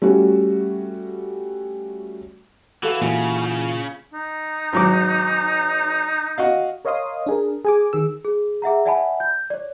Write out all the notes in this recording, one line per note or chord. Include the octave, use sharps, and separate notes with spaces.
G3 A3 C#4 F#4
E3 F#4 A4 F5
A#2 C#3 E3 E4
D#4
G#1 F#3 D6
F#4 D#5 F5
A#4 C#5 D#5 F5 C6 D#6
D4 G#4 A#4
G#4 G#5 D6
D#3 G#4 E6
G#4
G#4 E5 F#5 A#5
D5 E5 F#5 G#5 A5 B5
G6
C#5 D5